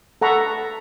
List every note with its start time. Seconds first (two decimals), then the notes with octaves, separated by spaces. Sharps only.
0.21 A4 F#5 A#5 B5 C#6